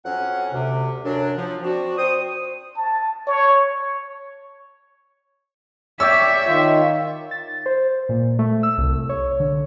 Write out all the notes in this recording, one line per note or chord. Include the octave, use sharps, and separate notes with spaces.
F2 F#3 C#4 F#5
D2 C3
F#2 F#3 D4
F3
C4 D4 F#4
C4 C5 D#6
A5
C#5
C#5 D5 E5 G5 E6
D#3 F4
A6
C5
A#2
A3
E6
C2
C#5
D3